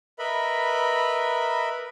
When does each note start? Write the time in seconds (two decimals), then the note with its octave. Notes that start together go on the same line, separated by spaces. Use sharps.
0.19 A#4 B4 D#5 E5 B5